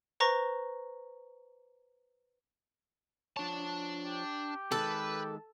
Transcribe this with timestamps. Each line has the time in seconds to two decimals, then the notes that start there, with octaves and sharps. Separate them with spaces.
0.20 B4 C5 A#5 C#6 A#6
3.37 F3 D4 C#5 A5
4.04 G4
4.72 D#3 G#3 A4 B4